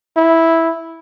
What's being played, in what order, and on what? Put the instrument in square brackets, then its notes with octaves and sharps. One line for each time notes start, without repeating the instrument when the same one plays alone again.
[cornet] E4